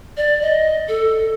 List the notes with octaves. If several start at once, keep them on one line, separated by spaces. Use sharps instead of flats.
D5
D#5
A4